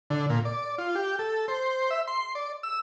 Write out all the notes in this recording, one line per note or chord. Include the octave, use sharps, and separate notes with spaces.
D3
A#2
D5
F4
G4
A4
C5
E5
C6
D5
E6